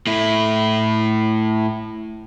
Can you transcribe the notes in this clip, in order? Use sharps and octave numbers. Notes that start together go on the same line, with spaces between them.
A2 E4